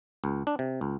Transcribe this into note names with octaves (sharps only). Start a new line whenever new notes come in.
C#2
D4
C3
C#2